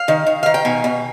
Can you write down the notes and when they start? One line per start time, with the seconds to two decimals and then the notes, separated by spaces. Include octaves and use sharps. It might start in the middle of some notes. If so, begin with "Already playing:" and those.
Already playing: F5
0.08 D#3
0.27 D#3
0.43 D#3 F5
0.54 G5
0.65 B2 G#5
0.84 B2